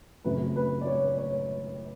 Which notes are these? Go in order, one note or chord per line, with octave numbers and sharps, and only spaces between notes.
F#2 C#3 F#3 A3 C4 B4
B4
D5
C#5
C#5